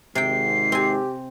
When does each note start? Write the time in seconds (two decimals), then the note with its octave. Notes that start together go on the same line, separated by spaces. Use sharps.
0.15 G#1 G#2 C3 G5 C7
0.72 C4 G4 G#5